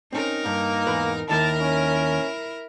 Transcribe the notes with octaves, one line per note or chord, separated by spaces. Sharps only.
C4 C#4 D#4 A#4
G2 A#3
E2 G#2 B4
D#2 D#3 E4 A#4 A5
C#4